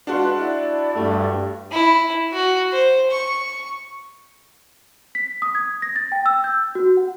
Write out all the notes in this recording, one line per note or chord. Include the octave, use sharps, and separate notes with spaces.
G#3 D4 F4 F#4 B4 F#5
E4 D5
G2 G3 A3
E4
F#4
C5
C#6
B6
D#6
G#6
A#6
A6
G5
E6
G6
F#4
F#5